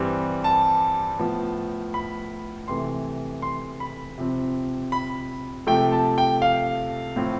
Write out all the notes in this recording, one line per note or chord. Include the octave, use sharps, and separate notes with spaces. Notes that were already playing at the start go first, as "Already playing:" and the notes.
Already playing: G2 E3 G3 C4
A5
A2 F3 B3
B5
C3 E3 A3 C6
C6
B5
C3 F3 C4
B5
C3 F3 A3 G5
A5
G5
F5
A2 F3 C4